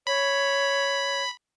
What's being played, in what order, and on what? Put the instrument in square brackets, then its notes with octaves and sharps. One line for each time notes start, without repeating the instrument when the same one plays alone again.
[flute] C#5 [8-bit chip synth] B5